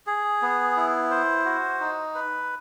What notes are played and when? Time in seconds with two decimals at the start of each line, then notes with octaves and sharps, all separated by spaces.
0.07 G#4
0.42 B3
0.77 E4
1.11 C5
1.45 F#4
1.80 D#4
2.15 B4